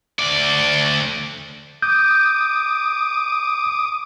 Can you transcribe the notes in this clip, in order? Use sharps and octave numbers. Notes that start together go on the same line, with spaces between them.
D2 D5
D6 D#6 G6